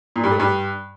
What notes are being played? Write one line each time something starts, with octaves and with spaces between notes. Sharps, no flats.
A#2
G2
A3
G2